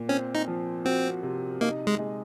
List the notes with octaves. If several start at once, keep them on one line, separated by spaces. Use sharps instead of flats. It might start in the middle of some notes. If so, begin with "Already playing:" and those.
Already playing: A#2
C4 C#4
D#4
F3
C4 F#4
C3
A#3 D#4
G#3
G#3